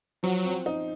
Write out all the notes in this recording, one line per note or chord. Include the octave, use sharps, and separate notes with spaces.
F3 F#3
C4
D#4